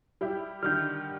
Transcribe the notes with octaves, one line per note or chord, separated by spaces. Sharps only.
G3 E4 G4
D3 D#3 G3 F6 G6